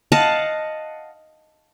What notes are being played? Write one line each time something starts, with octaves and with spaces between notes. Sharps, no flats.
D#5 F5 F#5 A5